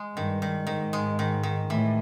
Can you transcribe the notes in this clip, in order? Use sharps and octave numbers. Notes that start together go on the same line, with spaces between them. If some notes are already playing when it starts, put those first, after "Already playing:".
Already playing: G#3
G2 D#3
D#3
G#2 D#3
G#3
D#3
D#3
A2 E3